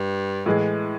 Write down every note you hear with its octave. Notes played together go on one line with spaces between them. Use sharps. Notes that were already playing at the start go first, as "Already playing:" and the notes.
Already playing: G2
A2 E3 G#3